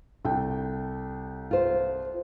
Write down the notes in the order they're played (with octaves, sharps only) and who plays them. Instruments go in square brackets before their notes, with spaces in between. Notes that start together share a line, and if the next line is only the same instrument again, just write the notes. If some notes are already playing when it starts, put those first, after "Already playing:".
[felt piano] C2 A4 G5
[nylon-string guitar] F4 C5